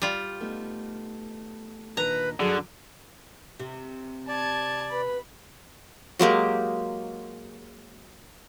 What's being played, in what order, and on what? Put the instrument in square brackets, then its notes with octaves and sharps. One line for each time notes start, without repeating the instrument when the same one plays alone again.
[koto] G3 F4
[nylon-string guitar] A3 B3 D#4
[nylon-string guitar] A#2 D#3 D4 [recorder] B4 [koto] A#5
[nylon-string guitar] G2 F#3 [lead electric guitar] D3 [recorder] G#4
[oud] C3
[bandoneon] D5 [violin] A5 G#6
[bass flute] B4 [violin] B5
[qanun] F#3 G#3 A#3 G4